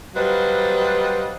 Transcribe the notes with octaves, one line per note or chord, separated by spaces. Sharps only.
F#3 G3 B4 C5 D#5 F5